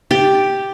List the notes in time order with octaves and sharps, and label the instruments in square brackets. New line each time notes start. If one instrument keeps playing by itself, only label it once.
[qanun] G4